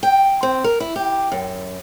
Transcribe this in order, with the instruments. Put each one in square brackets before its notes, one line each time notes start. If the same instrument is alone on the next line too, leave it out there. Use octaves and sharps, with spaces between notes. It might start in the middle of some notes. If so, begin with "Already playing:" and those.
[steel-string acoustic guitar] G5
C4
A#4
E4
G4
F#2